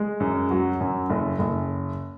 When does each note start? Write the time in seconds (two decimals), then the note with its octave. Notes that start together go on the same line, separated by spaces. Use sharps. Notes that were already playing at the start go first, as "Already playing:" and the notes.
Already playing: G#3
0.20 F#2
0.51 F#3
0.80 F#2
1.10 F#1
1.39 F#1